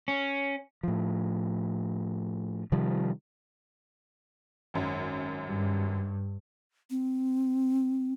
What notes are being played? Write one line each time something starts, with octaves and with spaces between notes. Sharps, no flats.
C#4
A2 F3
C3 D#3 F3 G3
G#1 F#2
G2
C4